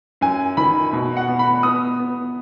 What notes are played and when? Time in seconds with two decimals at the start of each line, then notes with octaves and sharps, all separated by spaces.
0.21 F#2 G#5
0.57 D#3 B5
0.93 B2
1.17 F#5
1.28 B3
1.39 B5
1.63 B3 D#6
1.99 B3